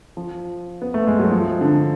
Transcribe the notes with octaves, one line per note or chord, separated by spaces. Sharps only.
F3
B3
A3
G#3
F#3
F3
D3